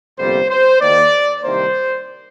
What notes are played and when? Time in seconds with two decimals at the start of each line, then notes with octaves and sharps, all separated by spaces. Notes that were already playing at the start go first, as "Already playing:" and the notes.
0.18 G1 F2 C3 G3 A#3 C5
0.50 C5
0.81 D#2 D#3 A#3 D5
1.44 C2 C3 D#3 A#3 C5